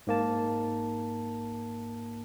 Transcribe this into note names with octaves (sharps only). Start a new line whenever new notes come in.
G#2 A#3 A5